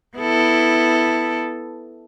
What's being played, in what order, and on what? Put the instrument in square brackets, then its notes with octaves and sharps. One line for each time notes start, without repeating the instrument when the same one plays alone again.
[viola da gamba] B3 E4 A4